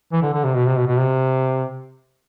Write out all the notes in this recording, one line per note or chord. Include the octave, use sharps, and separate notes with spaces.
E3
D3
D3
C3
B2
C3
B2
B2
C3